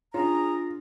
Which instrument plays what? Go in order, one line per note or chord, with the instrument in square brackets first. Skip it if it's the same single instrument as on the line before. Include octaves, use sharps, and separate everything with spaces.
[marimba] D4 C#5 [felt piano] F4 [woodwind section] G#4 A#5